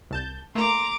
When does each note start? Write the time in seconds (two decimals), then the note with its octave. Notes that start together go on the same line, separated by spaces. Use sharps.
0.11 C2 A5 G6
0.55 A3 A#3 A#5 C6 D6